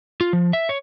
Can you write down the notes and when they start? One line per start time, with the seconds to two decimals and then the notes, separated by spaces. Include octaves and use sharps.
0.21 F4
0.33 F3
0.53 E5
0.69 C#5